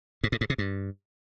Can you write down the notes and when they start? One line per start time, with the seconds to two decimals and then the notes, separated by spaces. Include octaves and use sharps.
0.24 G#2
0.32 A2
0.41 G#2
0.50 C3
0.58 G2